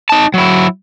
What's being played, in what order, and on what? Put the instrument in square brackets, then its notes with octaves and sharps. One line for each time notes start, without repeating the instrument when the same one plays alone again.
[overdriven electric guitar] D#4 A5
F#3 E4